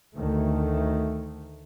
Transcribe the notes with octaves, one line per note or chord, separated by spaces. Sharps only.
D2 D#3 A3